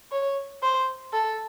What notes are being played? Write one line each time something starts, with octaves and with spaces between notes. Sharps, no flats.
C#5
C5
A4